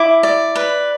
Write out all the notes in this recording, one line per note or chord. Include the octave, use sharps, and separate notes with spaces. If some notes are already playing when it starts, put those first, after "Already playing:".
Already playing: E4 D6
D5
B4